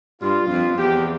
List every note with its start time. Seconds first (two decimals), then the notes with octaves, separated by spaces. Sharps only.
0.21 G2 F4
0.50 F2
0.78 E2 G4